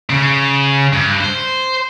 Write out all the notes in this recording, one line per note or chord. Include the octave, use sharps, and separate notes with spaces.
C#3
G2
C5